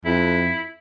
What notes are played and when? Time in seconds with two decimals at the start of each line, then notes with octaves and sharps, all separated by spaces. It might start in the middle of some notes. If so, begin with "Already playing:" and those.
0.05 F2 E4